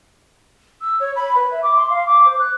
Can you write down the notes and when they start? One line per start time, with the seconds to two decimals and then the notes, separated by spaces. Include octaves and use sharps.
0.81 E6
0.99 C#5
1.15 B5
1.35 B4
1.51 E5
1.62 D6
1.76 C6
1.90 F5
2.06 D6
2.25 C5
2.39 F#6